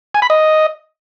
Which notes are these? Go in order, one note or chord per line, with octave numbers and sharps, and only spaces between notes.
G#5
B5
D#5